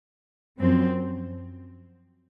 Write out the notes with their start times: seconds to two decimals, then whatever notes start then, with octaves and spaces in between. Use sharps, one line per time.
0.58 F#2 F3 C4